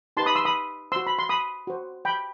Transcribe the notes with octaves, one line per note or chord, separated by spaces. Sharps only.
D#4 G4 B4 A5 C6
B5 D#6
C6 E6
B5 D#6
F#4 C5 C6 E6
B5
C6
B5 D#6
F#4 C5
G5 B5